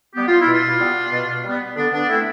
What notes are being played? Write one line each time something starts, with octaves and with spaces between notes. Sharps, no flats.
G3 B3 G4
F4
E4
B2
D4 F4
G3 B3
B2
G3 B3
D3 B3 D4
B3 D4
A3 C4 E4